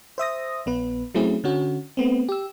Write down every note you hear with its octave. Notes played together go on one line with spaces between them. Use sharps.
C5 E5 D#6 A#6
A#1 B3 B4
F#3 A3 C4 C#4 E4 G#4
D3 C#4 F#4
A3 B3 C4
G4 E6